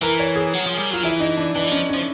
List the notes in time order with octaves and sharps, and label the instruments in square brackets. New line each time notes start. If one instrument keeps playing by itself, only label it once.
[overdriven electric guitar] E3 [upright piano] A#4
[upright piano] C#5
G#4
[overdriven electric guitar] F#3
F3
G3
[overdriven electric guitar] F#3 [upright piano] F4
[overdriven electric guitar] E3 [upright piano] E4
[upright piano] D#4
D4
[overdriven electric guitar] E3 [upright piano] D4
[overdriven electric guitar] F3 [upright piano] C#4
[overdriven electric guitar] F3 [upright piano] C#4